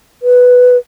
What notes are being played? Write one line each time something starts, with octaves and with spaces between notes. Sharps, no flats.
B4